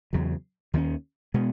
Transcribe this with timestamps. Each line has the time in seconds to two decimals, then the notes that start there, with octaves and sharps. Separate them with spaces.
0.13 E2 C#3 F#3
0.73 D#2 D#3 G#3 C#4
1.34 B2 G#3 B3